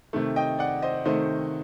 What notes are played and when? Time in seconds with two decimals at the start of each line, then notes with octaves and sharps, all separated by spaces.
0.13 C3 D#3 A3
0.36 D#5 G5
0.59 D5 F#5
0.82 C5 D#5
1.05 C3 D#3 A3 C5 D#5